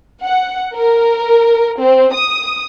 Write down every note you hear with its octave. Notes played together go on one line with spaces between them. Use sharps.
F#5
A#4
C4
D#6